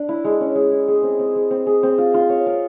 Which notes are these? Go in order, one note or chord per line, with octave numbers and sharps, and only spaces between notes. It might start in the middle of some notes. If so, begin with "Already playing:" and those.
Already playing: D4
E4
G#3
C#4
G#3
E4
G#4
C4
C4
G#3
C4
G#4
C4
F4
F4
C#5
A#4